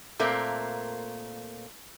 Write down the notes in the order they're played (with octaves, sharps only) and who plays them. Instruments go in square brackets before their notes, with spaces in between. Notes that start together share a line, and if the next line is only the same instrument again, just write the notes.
[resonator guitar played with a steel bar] A#2 A3 A#3 C4